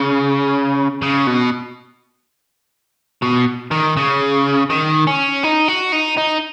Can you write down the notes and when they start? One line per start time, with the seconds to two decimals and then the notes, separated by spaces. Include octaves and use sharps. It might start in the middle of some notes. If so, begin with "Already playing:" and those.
Already playing: C#3
1.02 C#3
1.27 B2
3.22 B2
3.71 D#3
3.97 C#3
4.70 D#3
5.07 C#4
5.43 D#4
5.68 F#4
5.93 D#4
6.18 D#4